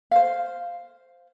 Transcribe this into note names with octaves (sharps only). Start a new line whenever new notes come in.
C5 F5